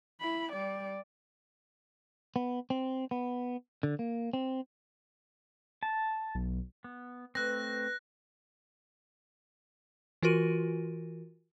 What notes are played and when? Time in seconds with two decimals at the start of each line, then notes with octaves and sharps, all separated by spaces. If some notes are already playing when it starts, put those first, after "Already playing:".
0.20 E4 B5
0.52 G3 D5
2.36 B3
2.70 C4
3.11 B3
3.83 D3
3.99 A#3
4.33 C4
5.83 A5
6.35 B1
6.84 B3
7.35 A3 C4 B4 F#6 A#6
10.22 E3 F4 F#4 A#4 D#7